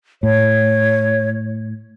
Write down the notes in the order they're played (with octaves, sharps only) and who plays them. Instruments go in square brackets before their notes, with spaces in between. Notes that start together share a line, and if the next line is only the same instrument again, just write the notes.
[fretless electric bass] A2 [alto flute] C#5